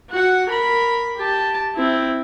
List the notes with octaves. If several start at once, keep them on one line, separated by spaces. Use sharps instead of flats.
F#4 F#5
A#4 B5
G4 A5
C4 E4